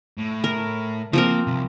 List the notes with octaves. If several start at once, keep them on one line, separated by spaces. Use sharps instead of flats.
A2
A#4
F3 A#3 C4 A#4
C2 C3